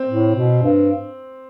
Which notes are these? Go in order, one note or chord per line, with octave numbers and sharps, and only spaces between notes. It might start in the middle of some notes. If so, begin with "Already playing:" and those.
Already playing: C4
A2
B2
G2